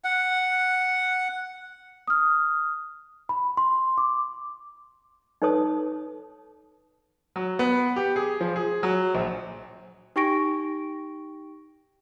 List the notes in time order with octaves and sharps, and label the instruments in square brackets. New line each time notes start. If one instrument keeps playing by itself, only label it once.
[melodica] F#5
[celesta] D#6 F6
B5
C6
D6
[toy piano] D#4 A4 B4 C#5 A5 D#6
[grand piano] F#3
B3
G4
G#4
F3
G#4
F#3
A#1
[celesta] D#4 G4 G5 C#6 A#6 D7